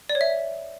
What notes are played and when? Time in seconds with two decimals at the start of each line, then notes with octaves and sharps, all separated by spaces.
0.09 D5
0.15 C#5
0.21 E5